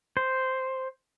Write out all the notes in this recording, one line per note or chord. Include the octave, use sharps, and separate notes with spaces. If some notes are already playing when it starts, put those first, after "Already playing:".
C5